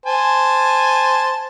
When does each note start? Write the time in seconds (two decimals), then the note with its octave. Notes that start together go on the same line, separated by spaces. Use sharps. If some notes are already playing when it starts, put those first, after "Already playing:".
0.06 C5 G#5 A5